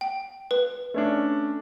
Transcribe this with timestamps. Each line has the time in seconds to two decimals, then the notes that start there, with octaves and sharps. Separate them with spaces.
0.01 G5
0.51 B4
0.94 A3 C#4 D4